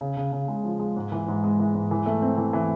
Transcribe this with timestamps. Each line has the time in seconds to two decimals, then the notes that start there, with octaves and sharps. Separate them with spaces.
0.01 C#3
0.17 C#3
0.32 C#3
0.48 G#3
0.64 F3
0.80 G#3
0.96 G#2
1.12 E3
1.28 G#2
1.44 G#3
1.59 E3
1.74 G#2
1.91 E3
2.06 A3
2.22 C4
2.37 E3
2.53 E3